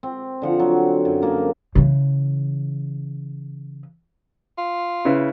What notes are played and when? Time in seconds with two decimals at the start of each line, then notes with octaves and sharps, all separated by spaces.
0.03 C4
0.42 D3 F3 F#5
0.59 F#3
1.05 F#2
1.22 F#2 A#3 G#4 A5
1.75 C#3 E3
4.58 F4
5.05 C#3 E4 B4